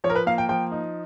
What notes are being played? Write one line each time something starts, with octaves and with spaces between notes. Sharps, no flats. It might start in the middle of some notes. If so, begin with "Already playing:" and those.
F3 C#5
A#4
B4
A#3 F5
G5
F3 G5
D#4